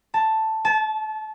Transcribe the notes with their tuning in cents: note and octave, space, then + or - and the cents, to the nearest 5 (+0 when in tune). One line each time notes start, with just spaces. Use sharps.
A5 +5
A5 -25